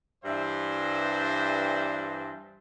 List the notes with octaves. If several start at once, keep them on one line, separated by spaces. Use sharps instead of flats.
G2 E3 G3 C5 E5